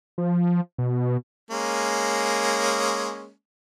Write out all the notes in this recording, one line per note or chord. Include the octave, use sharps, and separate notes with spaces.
F3
B2
G#3 A#3 C#4